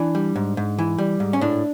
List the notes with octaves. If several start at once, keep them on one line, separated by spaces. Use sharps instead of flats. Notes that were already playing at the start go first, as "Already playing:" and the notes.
Already playing: E3 D4
G3
G#2
G#2
E3
G3
G#2
C#4
A2 D4